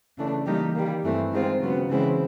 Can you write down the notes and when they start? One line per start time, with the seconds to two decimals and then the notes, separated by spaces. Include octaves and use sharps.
0.17 C#3 E3 A3 D4
0.46 E3 G3 A#3 D#4 G4
0.74 D#3 G3 A#3
1.03 G2 E3 A3 C4
1.32 D#3 G#3 C4 F4
1.61 C#3 F#3 B3
1.89 C#3 E3 G#3 C4 E4